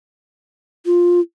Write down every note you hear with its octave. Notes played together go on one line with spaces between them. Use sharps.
F4